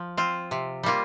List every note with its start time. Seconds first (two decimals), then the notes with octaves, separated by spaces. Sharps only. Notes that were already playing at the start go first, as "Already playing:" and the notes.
Already playing: F3
0.17 C4 F4
0.51 C3
0.83 G3 A#3 F4